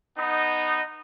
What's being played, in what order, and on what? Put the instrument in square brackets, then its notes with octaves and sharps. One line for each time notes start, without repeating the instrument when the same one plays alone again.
[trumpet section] B3 D#4